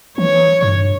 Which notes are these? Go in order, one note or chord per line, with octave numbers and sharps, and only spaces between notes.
E3 C#5
G2